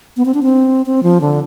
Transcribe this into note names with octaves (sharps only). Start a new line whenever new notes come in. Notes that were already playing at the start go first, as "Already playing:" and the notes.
B3
C4
D4
C4
C4
F3
D3